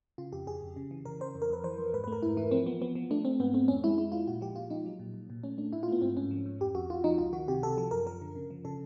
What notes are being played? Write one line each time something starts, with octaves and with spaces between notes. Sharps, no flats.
C#3 F4
F2 G4
F2 G#4
F2
C#3
E3
C#3 A#4
C#3 C5
F2
A#4
F2 B4
E3 C5
F2
G#2 B4
B4
A3
A#4
G#2 E4
E3 E4
F3 C4
F3 B3
F3 B3
F3
A3 D4
A3 C4
G#2 B3
A3 C4
F2 C#4
G#3 E4
G#3 E4
G#3 F4
A#2 F#4
F3 G4
A#2 F4
F3 D#4
F#3
A#2
A#2
A#2
A3 C#4
A3 D4
A2 E4
F4
A3 B3
G#2 C4
G#2 C#4
F3
G#2
F2 G4
F2 F#4
F2 F4
F3 D#4
C#2 F4
D#3 F#4
C3 G4
C3 A4
F3 A4
F#2 A#4
F3 A#4
D3
C#3
F3
C#3 A4